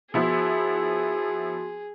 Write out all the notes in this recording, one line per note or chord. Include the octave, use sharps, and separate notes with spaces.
F3 B3 E4 F#4 G#4 C6